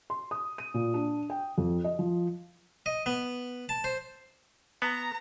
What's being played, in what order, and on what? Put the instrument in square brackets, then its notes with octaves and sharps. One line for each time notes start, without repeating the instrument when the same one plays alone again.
[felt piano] C6
D#6
D#7
A#2
D4
G5
F2
D#5
F3
[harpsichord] D#5
B3
A5
C5
[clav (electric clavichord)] B3 [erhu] A#5